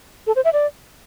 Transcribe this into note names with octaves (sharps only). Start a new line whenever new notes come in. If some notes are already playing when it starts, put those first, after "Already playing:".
A4
C5
E5
D5